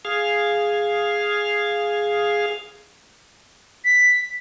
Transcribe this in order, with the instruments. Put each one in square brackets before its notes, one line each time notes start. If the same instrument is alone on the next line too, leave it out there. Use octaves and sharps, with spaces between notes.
[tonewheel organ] G#4 F5
[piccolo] B6